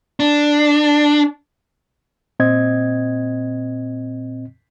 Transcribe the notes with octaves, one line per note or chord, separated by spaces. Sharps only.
D4
A#2 C4 D#5 G#6